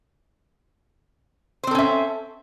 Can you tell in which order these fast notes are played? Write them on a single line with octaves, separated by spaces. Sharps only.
C5 C4 A4 C#4 E5